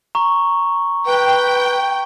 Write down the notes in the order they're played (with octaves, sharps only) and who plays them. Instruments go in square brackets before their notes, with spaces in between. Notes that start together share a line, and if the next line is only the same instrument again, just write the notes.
[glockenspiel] A#5 C#6
[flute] B4 [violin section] G5